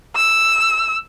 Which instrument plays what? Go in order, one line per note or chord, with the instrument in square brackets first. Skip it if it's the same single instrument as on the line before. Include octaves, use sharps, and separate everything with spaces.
[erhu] E6